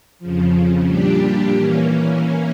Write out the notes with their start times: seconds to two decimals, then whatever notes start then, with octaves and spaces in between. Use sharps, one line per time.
0.19 F2 C#3 F3
0.86 A#2 G3 D4 G4
1.53 E3 A#3 C#4